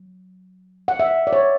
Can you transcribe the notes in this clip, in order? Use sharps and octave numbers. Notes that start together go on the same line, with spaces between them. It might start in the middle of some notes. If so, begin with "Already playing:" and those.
Already playing: F#3
F#5
E5
D5
C#5